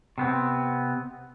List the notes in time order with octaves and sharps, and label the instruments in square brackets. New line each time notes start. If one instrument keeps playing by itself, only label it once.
[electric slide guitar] C3 B3 C4